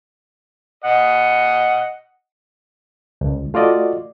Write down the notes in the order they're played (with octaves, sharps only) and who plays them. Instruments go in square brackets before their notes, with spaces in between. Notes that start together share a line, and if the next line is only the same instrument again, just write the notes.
[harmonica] D#5 F#5
[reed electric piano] C#2
A3 F4 F#4 D5 D#5